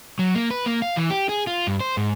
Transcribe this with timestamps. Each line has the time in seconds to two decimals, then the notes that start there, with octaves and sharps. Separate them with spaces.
0.19 F#3
0.35 A#3
0.50 B4
0.66 A#3
0.82 F5
0.97 E3
1.10 G4
1.29 G#4
1.47 F4
1.67 G2
1.80 C5
1.97 G#2